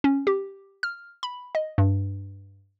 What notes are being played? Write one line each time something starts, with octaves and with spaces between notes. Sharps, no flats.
C#4
G4
F6
B5
D#5
G2